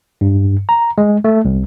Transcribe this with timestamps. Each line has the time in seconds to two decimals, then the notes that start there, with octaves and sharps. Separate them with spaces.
0.21 G2
0.69 A#5
0.98 G#3
1.24 A3
1.45 C2